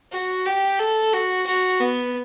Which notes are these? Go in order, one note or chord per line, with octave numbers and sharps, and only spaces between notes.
F#4
G4
A4
F#4
F#4
B3